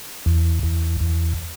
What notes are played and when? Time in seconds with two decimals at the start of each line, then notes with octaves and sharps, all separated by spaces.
0.26 E2
0.63 E2
1.00 E2